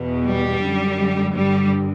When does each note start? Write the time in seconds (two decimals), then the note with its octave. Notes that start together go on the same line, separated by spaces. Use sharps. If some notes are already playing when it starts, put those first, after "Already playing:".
Already playing: E2 B2
0.24 G3
0.61 F#2 D3
1.34 G2 D3 G3